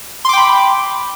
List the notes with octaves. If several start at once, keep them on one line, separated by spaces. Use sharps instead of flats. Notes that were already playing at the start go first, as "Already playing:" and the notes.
G5 B5 C6 D6